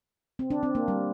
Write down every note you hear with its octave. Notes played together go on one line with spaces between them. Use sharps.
C4
D4
C4
A#3
G3